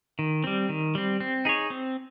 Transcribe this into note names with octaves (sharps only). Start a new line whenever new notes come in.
D#3
G3 C4
D#3
G3 C4
C4
D#4 G#4 C#5
C4